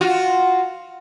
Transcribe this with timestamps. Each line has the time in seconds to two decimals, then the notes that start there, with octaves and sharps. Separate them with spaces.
0.01 F4 F#4